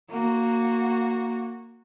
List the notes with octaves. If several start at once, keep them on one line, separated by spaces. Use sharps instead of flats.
A#3 F#4